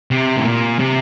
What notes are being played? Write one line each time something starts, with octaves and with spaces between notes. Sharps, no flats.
C3
A2
A#2
C3